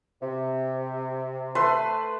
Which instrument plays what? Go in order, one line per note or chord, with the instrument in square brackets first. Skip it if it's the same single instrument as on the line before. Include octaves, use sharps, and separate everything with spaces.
[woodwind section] C3
[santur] A3 B4 C6